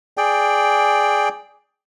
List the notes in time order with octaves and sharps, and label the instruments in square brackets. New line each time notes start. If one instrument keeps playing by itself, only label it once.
[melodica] G#4 D5 G5